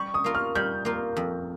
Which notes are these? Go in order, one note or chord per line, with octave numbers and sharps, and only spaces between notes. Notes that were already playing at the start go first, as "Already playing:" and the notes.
Already playing: G3 C#6
D#6
A#3 F4 A#4
F6
G3 G6
A#3 F4 A#4
F2